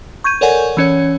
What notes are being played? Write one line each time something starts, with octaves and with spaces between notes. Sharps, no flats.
C#6 G6 G#6 D#7
A4 A#4 C#5 D5 F#5 G#5
E3 C#4 C#5